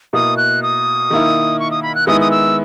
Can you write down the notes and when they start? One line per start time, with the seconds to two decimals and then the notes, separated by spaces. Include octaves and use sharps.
0.13 B2 A#3 E4 D#6
0.37 F#6
0.63 D#6
1.10 D#3 A#3 E4
1.59 C#6
1.71 D#6
1.83 B5
1.95 F#6
2.07 D#3 G#3 B3 E4 D#6
2.21 D#6
2.31 E6